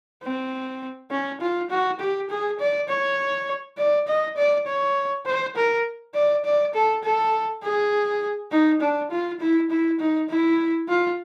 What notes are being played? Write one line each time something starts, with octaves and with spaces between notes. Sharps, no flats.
C4
C#4
F4
F#4
G4
G#4
D5
C#5
D5
D#5
D5
C#5
C5
A#4
D5
D5
A4
A4
G#4
D#4
D4
F4
E4
E4
D#4
E4
F4